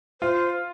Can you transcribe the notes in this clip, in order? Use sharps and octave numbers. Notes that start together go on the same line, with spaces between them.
F4 C5